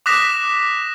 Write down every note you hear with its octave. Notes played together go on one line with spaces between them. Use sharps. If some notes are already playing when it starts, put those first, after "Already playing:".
D6 D#6 F#6 A#6 B6 E7